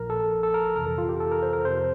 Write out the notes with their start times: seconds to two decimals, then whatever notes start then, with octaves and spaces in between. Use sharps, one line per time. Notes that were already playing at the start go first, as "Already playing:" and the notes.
Already playing: A#1 A#2 F3 A#4
0.10 A4
0.43 A4
0.54 A#4
0.76 F2 C3 E3 A#4
0.87 A4
0.98 F4
1.09 G4
1.20 A4
1.31 A#4
1.43 C5
1.53 A#4
1.65 F2 C3 F3 C5